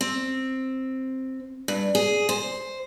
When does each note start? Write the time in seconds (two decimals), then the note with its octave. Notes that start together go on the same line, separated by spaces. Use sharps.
0.01 C4
1.68 G2
1.95 G#4
2.29 C5